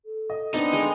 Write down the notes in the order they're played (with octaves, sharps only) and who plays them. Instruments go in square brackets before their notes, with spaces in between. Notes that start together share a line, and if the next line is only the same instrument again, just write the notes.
[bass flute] A4
[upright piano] D#5
[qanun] B3 C4 [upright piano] D4 [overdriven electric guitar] D#4
[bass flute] D3 [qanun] G#3 G5 G#5